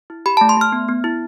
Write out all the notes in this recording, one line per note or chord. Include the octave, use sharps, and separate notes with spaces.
E4
G4 B5
A3 A5
C6
A3 F6
B3
B3
E4